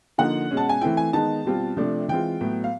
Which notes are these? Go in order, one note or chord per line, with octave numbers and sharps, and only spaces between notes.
D3 F3 A#3 D#4 F#5
B2 G#3 C#4
A5
G#5
E3 A3 C4 E4 G5
G#5
D#3 G#3 B3 D#4 A5
B2 G3 C4 F4
C3 F3 A3 D4
E3 G#3 C4 F4 G5
A2 F#3 B3
F5